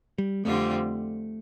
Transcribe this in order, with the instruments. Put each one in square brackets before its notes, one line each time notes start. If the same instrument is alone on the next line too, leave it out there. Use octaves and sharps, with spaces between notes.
[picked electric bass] G3
[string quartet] F2 D3 G3 C4 F4 [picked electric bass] A3